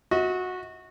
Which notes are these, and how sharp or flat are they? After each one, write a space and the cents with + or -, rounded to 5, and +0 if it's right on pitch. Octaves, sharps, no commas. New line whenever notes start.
F#4 -15 D#5 +45